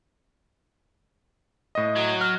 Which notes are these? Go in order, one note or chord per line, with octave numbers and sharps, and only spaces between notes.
A2 D#5
F#3
F6